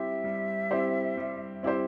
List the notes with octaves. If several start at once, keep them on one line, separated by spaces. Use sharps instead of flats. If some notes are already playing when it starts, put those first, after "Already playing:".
Already playing: G3 C4 E4 G4 C5 E5
G3
C4 E4 G4 C5
G3
C4 E4 G4 C5